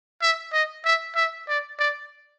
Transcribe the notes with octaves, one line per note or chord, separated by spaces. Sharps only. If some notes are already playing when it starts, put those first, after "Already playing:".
E5
D#5
E5
E5
D5
D5